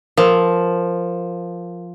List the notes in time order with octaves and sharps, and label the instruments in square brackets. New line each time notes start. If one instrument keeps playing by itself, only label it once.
[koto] F3 [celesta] A#4